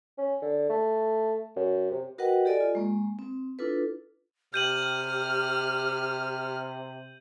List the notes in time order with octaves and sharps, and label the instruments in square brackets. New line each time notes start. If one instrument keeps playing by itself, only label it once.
[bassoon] C#4
D3
A3
F#2
C3
[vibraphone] F#4 A#4 B4 D#5 F#5 G5
G4 A4 D5 D#5 G#5
F4
G#3 A#3
C4
D4 E4 F4 A4 B4
[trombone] C3 [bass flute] G4 [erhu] F6 [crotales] G6 D#7 F#7